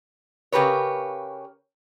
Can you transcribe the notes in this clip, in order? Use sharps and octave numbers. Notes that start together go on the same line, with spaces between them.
C#3 G4 A#4 B4 C#5